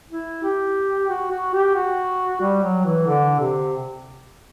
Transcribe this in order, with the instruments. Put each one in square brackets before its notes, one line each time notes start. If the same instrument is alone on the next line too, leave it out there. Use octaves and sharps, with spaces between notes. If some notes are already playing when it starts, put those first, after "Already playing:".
[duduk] E4
G4
F#4
F#4
G4
F#4
G3
F#3
E3
D3
C3